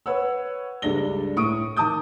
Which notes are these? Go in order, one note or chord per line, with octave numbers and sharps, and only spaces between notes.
B4 C#5 F#5 E6
C#2 G2 D4 A4 A#6 G7
A2 C#6 D#6 D7
D#3 A5 D6 D#6 G6